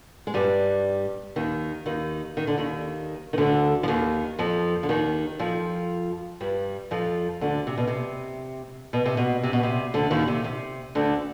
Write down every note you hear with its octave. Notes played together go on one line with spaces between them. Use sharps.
G#3
G2 G3
D#2 D#3
D#2 D#3
D#3
D3
D#2 D#3
D#3
D2 D3
F3
D#2 D#3
F2 F3
D3
D#2 D#3
F2 F3
G2 G3
F2 F3
D2 D3
C3
B2
C3
B2
C3
B2
C3
B2
C3
D2 D3
D#2 D#3
C3
C3
D2 D3